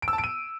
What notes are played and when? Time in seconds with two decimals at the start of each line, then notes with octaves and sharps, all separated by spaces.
0.02 D7
0.08 E6
0.13 A5
0.18 D7
0.24 D#7